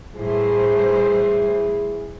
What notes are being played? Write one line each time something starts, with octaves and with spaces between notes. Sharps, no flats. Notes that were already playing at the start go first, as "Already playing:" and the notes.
A2 E3 G3 G#4 C5